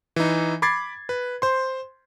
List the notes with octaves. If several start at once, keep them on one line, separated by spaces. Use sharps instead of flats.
E3 D#4
B5 D6 G#6 A6 C7
B4
C5 C6